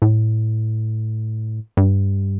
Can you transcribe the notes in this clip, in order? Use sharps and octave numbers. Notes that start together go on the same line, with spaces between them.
A2
G2